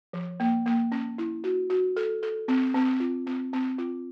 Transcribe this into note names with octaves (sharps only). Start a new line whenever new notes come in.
F3
A#3
A#3
C#4
E4
F#4
F#4
A4
A4
C4
C4
F4
C4
C4
F4